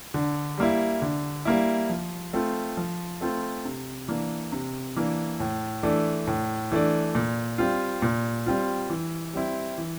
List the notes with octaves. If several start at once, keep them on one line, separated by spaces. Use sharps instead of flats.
D3
G3 A#3 E4
D3
G3 A#3 E4
F3
A3 C4 F4
F3
A3 C4 F4
C3
E3 A#3 D4
C3
E3 A#3 D4
A2
E3 A3 D4
A2
E3 A3 D4
A#2
G3 C4 F4
A#2
G3 C4 F4
E3
G3 C4 E4
E3